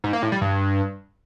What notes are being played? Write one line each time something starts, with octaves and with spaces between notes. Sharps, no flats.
G#2
A#3
A2
G3
G2